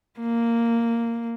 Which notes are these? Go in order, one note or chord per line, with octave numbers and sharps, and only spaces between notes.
A#3